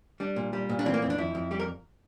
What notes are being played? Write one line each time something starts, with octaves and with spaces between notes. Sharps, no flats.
G3 D4
A#2
G3
A#2
D4
E3 C4
A#3
F2 C4
D4
F2 E4
F2
G3 G4
A#4